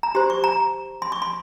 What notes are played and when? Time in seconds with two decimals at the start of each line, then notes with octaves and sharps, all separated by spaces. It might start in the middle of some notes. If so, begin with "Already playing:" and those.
0.03 A#5
0.15 G4 C5 C6
0.30 C#6
0.44 A#5
1.02 C6
1.12 C#6
1.22 C6